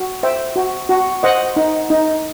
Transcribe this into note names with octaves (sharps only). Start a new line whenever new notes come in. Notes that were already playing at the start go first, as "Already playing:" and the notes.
Already playing: F#4
C5 E5 G5
F#4
F#4
C5 D#5 F#5
D#4
D#4